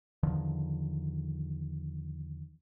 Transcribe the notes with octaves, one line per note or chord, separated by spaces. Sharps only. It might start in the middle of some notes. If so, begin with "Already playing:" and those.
E2 D3 D#3 F3